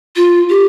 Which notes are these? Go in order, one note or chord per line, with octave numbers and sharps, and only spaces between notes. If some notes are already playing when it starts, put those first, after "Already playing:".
F4
G4